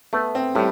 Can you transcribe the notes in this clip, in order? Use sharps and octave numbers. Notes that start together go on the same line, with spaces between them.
A3 B3
C4
A2 G3